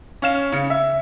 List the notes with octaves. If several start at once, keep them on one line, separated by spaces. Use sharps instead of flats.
C#4 F5 E7
C#3 C#7
E5